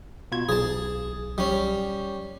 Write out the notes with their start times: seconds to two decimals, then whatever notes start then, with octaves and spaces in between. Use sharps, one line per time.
0.32 B2 F4 G#6
0.49 B1 G#4 A5
1.38 G3 C#4